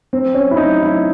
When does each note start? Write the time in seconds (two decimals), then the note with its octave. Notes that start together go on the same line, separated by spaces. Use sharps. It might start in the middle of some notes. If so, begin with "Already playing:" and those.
0.13 C4
0.34 C#4
0.51 E4
0.57 D#4
0.80 E4